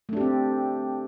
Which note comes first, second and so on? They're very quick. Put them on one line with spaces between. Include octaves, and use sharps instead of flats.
A3 D4 G4 C4